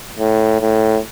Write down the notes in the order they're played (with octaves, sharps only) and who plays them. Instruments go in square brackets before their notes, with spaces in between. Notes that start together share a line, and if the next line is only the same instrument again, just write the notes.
[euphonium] A2
A2